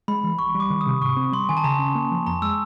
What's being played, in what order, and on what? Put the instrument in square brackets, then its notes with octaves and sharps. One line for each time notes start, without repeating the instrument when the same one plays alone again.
[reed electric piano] G#3 [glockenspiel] B5
[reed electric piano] E3
[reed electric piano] C2 [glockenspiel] C#6
[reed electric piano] G3
[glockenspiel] D6
[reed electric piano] D#3
[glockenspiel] D#6
[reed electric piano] C3
[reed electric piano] G#2 [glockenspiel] C#6
[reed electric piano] C4
[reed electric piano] G3 [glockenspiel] C6
[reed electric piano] D#3 [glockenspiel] G#5
[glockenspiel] A5
[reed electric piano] C#3 [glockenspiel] A#5
[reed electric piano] C#4
A#3
F3
[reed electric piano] F2 [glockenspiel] A#5
[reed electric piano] G#3 [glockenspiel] E6